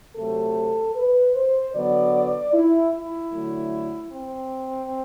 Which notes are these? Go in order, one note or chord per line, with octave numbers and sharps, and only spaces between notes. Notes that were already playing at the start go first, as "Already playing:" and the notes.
C3 F#3 A3 A4
B4
C5
D3 F#3 B3 D5
E4
E4
D3 F#3 A3
C4